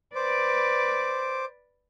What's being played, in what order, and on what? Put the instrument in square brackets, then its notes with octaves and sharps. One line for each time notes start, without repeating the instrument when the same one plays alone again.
[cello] B4 D5 [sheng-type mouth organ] C5 D6